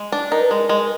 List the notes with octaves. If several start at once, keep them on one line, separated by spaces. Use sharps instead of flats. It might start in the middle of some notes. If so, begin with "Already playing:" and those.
Already playing: G#3
D4
D#4 A#4
B4
G#3 A#4
G#3